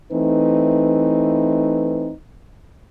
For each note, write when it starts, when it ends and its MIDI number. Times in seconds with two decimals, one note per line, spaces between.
0.11 2.12 52
0.11 2.12 57
0.11 2.12 60
0.11 2.12 63
0.11 2.12 71